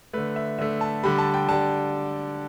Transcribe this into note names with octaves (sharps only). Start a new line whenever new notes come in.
D3 A3 B4
E5
D3 A3 E5
A5
D3 G3 B5
A5
G5
D3 G3 A5